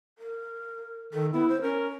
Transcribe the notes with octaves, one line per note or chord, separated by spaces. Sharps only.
A#4
D#3 A4
B3 E4
C5
C#4 A#4